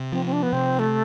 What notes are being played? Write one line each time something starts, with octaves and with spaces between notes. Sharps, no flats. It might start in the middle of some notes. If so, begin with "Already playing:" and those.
Already playing: C3
F3 C4
C4
D4
B3
C3 C4
A3